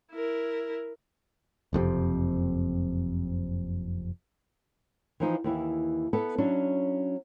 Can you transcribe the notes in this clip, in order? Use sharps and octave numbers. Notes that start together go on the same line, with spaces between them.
E4 A#4
F#1 F2 G#2 C3
E3 F3 D#4
D#2 E3 E4
B3 E4 A4 B4
F#3 C#4 D4 E4